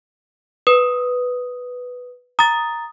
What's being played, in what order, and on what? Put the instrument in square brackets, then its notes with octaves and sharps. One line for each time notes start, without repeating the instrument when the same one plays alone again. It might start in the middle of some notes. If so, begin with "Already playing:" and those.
[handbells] B4 [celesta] D#6
[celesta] A#5 A6 [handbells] D#6